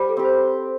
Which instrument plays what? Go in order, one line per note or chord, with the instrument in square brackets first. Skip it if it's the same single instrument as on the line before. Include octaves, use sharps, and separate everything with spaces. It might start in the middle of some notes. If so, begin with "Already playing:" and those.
Already playing: [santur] G3 [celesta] C5
[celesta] A4
[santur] C4 G4
[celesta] C5